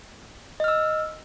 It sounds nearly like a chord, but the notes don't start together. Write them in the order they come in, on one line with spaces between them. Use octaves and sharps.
D#5 F6 E6